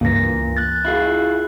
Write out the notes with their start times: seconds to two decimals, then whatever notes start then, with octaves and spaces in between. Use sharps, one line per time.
0.01 C#2 G2 A#2 E3 A#3 A#6
0.57 F#6 A6
0.85 E4 F4 G#4